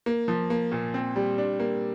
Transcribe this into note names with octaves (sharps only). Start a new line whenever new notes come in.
A#3
F3
A#3
A#2
C4
G3
D4
A#3